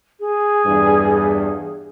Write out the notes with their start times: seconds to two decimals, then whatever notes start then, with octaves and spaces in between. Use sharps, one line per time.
0.20 G#4
0.66 E2 G2